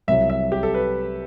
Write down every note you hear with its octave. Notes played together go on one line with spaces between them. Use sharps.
C2 C3 F#3 E5
E5
G4
A4
B4